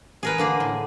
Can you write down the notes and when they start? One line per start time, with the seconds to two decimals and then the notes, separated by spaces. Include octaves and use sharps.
0.23 G#4 A#4 B4
0.38 D3 A#3 G#4
0.60 A2